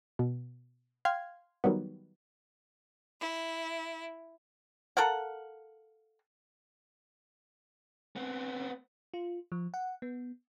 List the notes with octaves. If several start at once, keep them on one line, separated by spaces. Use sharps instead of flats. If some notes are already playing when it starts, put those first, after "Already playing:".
B2
F5 G5 C6 F6 G#6
D#3 F#3 G3 B3
E4
A4 A#4 F5 F#5
B3 C4
F4
F3
F#5
B3